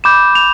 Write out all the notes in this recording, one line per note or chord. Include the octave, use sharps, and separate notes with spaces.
B5 D6 G6 E7
F7